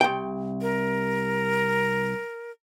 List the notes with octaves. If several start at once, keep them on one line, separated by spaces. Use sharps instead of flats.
C2 G5
A#4